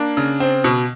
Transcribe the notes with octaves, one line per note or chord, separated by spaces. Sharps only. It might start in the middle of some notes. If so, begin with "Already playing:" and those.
Already playing: A#3 D4
C#3
C4
B2